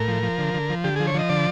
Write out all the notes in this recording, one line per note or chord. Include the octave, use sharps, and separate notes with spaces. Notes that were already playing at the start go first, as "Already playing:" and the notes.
Already playing: A2 A#4
F3
F3
D3
D3
F3
D3 G4
F3 G#4
C#5
F3 D#5
D3 D5